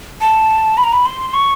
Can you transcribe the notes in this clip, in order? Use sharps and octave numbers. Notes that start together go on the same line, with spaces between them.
A5
B5
A#5
B5
C6
C#6